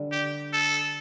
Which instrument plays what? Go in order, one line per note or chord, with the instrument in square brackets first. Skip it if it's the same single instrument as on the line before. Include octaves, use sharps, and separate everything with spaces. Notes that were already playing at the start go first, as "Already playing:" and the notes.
Already playing: [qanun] D3 G3 D4
[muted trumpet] G4
A4